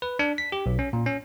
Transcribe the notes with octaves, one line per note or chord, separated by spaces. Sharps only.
B4
D4
B6
G4
B1
C#4
A#2
C#4